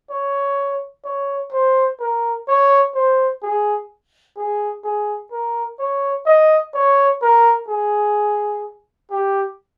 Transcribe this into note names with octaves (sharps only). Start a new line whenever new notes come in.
C#5
C#5
C5
A#4
C#5
C5
G#4
G#4
G#4
A#4
C#5
D#5
C#5
A#4
G#4
G4